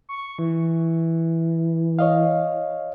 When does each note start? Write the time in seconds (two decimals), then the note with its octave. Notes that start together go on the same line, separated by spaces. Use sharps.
0.09 C#6
0.39 E3
1.99 C#5 D#5 F5